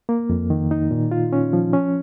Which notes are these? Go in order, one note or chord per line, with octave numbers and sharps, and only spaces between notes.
A#3
F2
D#3
D#4
A#2
F4
C#4
F3
C#4